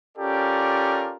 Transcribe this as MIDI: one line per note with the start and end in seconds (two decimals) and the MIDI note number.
0.18 1.16 61
0.18 1.16 65
0.18 1.16 67
0.18 1.16 69
0.18 1.16 70
0.18 1.16 74